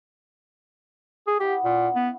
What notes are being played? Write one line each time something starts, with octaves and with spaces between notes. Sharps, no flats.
G#4
B3 E4 G4 F#5
A#2 C#4
B3 F5